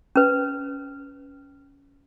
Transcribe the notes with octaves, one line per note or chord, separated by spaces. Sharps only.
C#4 B4